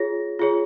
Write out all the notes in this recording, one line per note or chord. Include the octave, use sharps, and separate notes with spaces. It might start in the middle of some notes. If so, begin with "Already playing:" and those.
Already playing: F4 G#4 C#5 A#6
F4 G#4 C#5